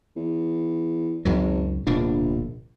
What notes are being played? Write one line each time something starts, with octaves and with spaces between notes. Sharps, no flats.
E2
G#1 C#2 F#2 F#3
D1 A#1 B2 D4